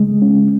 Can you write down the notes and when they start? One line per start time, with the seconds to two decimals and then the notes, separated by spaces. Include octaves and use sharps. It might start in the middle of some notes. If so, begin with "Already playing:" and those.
Already playing: C#3 G#3
0.22 C#4